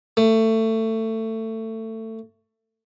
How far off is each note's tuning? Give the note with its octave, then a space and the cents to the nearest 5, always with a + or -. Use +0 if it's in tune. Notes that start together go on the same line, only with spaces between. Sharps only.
A3 +20